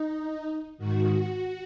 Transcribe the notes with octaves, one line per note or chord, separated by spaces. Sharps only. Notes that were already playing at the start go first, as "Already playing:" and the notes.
Already playing: D#4
G#2 D#3 F#4